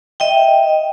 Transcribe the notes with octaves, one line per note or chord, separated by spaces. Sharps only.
D#5 E5 G5